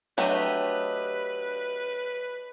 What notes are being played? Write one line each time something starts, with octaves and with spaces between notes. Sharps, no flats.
F#3 A3 D4 G4 B4 D#5